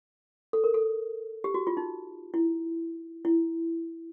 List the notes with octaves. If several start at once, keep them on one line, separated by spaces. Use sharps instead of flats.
A4
A#4
A4
G4
F#4
F4
D#4
E4
E4